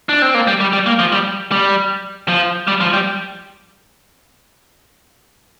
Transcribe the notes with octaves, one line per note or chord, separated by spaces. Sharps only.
D4
C4
A#3
G3
G3
G3
A#3
F3
G3
G3
F3
G3
F3
G3